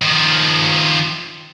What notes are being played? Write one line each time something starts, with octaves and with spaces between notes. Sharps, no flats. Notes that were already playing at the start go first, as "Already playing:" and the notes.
D#3 F3